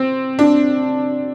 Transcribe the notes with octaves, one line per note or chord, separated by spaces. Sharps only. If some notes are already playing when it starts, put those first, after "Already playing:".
Already playing: C4
D4